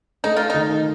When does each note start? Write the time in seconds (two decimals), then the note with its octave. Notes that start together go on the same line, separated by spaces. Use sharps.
0.24 A3 D#4
0.36 F4
0.50 D#4
0.54 D#3